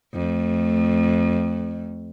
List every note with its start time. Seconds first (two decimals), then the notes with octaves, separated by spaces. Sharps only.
0.14 F2 A3